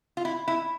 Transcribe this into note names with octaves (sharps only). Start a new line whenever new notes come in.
F4
E4
E4